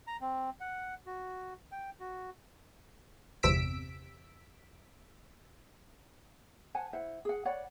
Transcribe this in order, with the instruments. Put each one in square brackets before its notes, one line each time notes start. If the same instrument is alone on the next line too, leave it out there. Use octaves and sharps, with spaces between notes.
[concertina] A#5
C4
F#5
F#4
G5
F#4
[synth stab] G1 E2 C3 E6 B6 D7
[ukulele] C5 F#5 G#5 A5
E4 C5 F#5
G#4 F#5
C#5 D5 F#5 B5